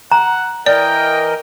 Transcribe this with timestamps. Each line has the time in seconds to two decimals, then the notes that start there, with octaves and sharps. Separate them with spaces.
0.12 F#5 A#5
0.66 E3 A#4 D5 D#5 G5